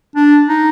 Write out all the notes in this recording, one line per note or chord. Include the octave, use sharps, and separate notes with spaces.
D4
D#4